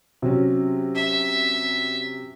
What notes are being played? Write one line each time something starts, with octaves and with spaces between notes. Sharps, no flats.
C3 F#3 C#4
E5